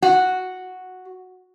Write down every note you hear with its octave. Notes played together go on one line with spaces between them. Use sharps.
F#4